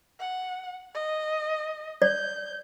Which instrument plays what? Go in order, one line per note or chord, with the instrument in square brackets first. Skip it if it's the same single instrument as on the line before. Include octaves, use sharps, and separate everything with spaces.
[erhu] F#5
D#5
[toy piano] D5 [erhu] G6